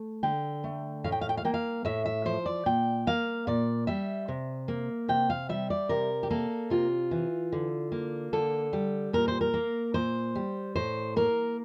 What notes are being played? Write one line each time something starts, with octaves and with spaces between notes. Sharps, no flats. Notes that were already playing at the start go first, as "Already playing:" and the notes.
Already playing: A3
D3 G5
A3
A2 F5
G5
F5
G5
F5
A#3 G5
F5
A2 E5
E5
F3 C5
D5
A#2 G5
A#3 F5
A#2 D5
G3 E5
C3
A#3
C3 G5
F5
G3 E5
D5
C3 A#4
G4
A#3 A4
C3 F4
E3
D3
A#3
D3 A4
G3
A#2 A#4
C5
A#4
A#3
A#2 C5
G3
A2 C5
A#3 A#4